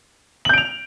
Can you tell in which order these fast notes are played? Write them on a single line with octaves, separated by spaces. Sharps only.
F#7 G6 D7 F7